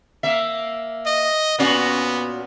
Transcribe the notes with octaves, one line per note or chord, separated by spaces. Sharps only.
A#3 E5
D#5
A#2 B3 C#4 F#4